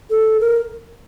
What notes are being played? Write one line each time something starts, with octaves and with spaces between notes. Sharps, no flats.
A4
A#4